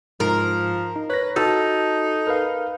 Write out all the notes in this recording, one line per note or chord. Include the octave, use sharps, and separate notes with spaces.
G#2 F3 A#4
D#4
B4 C#5 A#6
D#4 F#4 A4
A#4 B4 F5